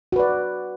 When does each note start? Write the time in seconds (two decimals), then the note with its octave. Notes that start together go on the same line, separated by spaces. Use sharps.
0.12 F#4
0.16 B4
0.19 D5